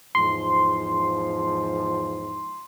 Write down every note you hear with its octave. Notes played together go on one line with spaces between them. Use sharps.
E2 G#2 F3 C6